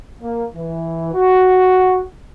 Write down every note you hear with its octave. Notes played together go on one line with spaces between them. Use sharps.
A#3
E3
F#4